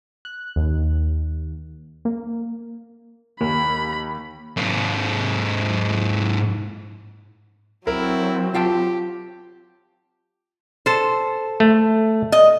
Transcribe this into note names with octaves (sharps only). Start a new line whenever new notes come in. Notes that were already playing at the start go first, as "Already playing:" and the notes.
F#6
D#2
A#3
D#2 A#3 B5
G#2 A#3
F#3 C4 E4 A#4
F4 G4 G5 A5
A4 C5
A3
D#5